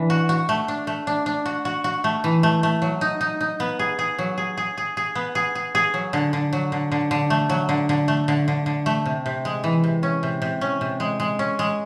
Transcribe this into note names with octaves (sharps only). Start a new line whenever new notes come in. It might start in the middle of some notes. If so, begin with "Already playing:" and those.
Already playing: E3 D4
F#4
F#4
A3
D4
A3
D4
D4
F#4
F#4
F#4
A3
E3
A3
A3
F#3
D#4
D#4
D#4
B3
G#4
G#4
F#3
G#4
G#4
G#4
G#4
B3
G#4
G#4
G#4
F#3
D3
D3
F#3
D3
D3
D3
A3
F#3
D3
D3
A3
D3
D3
D3
A3
C3
C3
G#3
E3
C3
C#4
C3
C3
C#4
C3
G#3
G#3
C#4
G#3